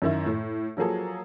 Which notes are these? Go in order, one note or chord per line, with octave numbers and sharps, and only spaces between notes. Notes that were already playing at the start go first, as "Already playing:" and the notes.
F#2 D#3 E4
A2
F3 F#3 A#3 G#4 A4